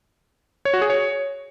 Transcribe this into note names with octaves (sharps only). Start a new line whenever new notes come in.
C#5
F#4
G#4
C#5